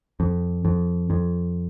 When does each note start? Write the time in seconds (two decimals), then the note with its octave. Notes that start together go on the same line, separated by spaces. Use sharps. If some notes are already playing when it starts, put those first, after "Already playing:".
0.20 F2
0.65 F2
1.10 F2